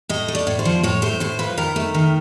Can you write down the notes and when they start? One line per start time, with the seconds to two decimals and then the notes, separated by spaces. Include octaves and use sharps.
0.09 A2 D#5
0.28 A3
0.35 D5
0.47 A2
0.59 C5
0.65 F3
0.83 A2 C#5
1.02 A3 C5
1.20 A2 C5
1.39 F3 B4
1.57 D#3 A#4
1.76 A3
1.94 D#3